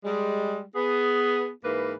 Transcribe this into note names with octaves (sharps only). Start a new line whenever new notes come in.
G3 G#3
B3 G#4
G#2 E3 A#3 B4